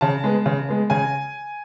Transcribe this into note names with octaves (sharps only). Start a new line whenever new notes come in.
C#3 A5
G#3 B3
C#3
G#3 B3
C#3 G#5